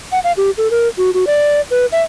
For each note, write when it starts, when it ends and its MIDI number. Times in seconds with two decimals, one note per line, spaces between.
0.12 0.19 78
0.24 0.32 77
0.37 0.50 67
0.57 0.70 69
0.71 0.88 70
0.98 1.10 66
1.14 1.24 66
1.27 1.61 74
1.71 1.86 71
1.92 2.02 76